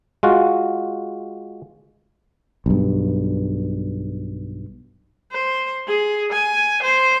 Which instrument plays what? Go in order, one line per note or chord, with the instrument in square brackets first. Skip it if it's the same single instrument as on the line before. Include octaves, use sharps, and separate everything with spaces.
[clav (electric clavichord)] G#3 F4 F#4
[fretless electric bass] B1 G2
[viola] C5
G#4
G#5
C5